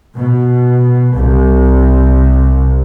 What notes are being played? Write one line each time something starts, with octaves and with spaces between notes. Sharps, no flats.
B2
C2